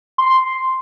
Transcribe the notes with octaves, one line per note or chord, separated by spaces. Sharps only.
C6